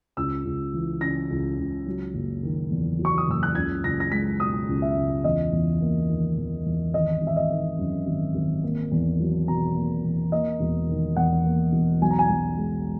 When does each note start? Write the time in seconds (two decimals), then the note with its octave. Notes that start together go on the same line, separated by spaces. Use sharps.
0.17 C#2 E6
0.45 C#2
0.73 E3
1.01 C#3 A#6
1.30 C#2
1.58 C#2
1.86 F#3
2.14 F#1
2.43 D#3
2.71 E2
2.99 F#3
3.05 C#6
3.18 D#6
3.28 F#1 E6
3.43 F#6
3.55 C#2 G#6
3.84 C#2 A#6
4.00 A#6
4.12 G#3 B6
4.40 B2 D#6
4.69 C#2
4.82 E5
4.96 C#2
5.24 E2 D#5
5.52 E2
5.81 A#3
6.09 D#3
6.37 E2
6.66 E2
6.94 G#1 D#5
7.22 G#1
7.27 E5
7.36 D#5
7.50 D#3
7.79 F#2
8.06 G#1
8.35 G#1
8.63 A#3
8.91 E2
9.20 F#3
9.48 B2 A#5
9.75 A#3
10.04 E2
10.32 A#3 D#5
10.60 E1
10.89 D#3
11.17 E2 F#5
11.45 A#3
11.73 E1
12.01 B1 G#5
12.11 A#5
12.19 G#5
12.29 B1
12.58 G#3